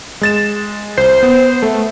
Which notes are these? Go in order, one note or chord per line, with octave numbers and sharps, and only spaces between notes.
G#3 A6 E7
C2 C5
B3
A3